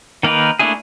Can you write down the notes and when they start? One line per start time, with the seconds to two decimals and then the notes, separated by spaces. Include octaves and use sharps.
0.23 D#3 A#3 D#4 A#4 B4
0.59 A3 A#3 D4 E4 G#4